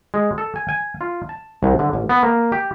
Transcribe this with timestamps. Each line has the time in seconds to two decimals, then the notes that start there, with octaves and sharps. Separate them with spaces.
0.14 G#3
0.38 A4
0.56 G#5
0.69 G#5
1.01 F4
1.29 A5
1.63 C2
1.79 D3
1.93 A1
2.09 B3
2.23 A#3
2.52 G4